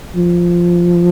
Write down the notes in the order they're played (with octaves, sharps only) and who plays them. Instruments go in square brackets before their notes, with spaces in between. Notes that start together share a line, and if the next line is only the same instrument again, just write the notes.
[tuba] F3